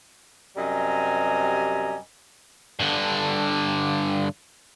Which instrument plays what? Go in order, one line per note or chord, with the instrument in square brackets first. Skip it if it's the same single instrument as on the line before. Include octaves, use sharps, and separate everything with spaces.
[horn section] F#2 C3 G3 D#5 G#5 A#5
[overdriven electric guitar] G2 D3